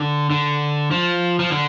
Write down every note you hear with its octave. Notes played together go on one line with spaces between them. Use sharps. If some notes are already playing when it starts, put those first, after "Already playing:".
Already playing: D3
D3
F3
F3
D3